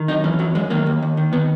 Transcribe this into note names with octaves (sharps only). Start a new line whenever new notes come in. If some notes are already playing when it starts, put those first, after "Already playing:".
Already playing: D#3
F#2 D#4
E3 C#4
F#2 F#3
F#2 G#3
D#3 A#3
D#2
D#2
D#3
D#3 B3